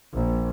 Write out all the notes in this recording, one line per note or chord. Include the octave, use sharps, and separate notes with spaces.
A#1